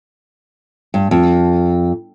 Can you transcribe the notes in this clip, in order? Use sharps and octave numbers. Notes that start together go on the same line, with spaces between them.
G2
F2